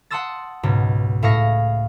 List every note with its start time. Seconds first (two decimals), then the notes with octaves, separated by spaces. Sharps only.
0.10 F#5 A5 C6 D#6 E6 A6
0.63 C#2 G#2 B2
1.23 A2 E5 F5 C#6 D#6 A#6